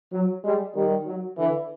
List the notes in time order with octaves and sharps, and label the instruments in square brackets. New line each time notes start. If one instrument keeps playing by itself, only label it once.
[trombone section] F#3
[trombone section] G3 [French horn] G#3
[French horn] D#3 [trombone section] G3
[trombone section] F#3
[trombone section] D3 [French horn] E3